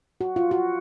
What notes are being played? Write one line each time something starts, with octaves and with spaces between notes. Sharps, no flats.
F#4
F4
F#4